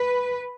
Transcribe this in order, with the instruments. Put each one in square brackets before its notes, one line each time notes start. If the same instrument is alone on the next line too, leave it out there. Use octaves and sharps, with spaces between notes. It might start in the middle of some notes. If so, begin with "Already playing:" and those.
Already playing: [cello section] B4